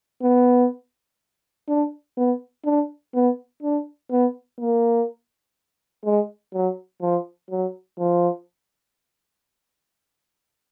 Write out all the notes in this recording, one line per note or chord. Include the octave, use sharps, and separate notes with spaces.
B3
D4
B3
D4
B3
D4
B3
A#3
G#3
F#3
F3
F#3
F3